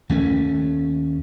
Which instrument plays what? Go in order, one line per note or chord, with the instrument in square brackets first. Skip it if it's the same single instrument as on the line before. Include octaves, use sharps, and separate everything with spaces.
[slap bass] D#2 A3 C#4